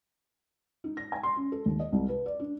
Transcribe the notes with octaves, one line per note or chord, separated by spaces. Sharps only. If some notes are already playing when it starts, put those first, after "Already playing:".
D#4
A#6
G#5
C6
C#4
A4
D#2
D#5
C2
B4
D5
D4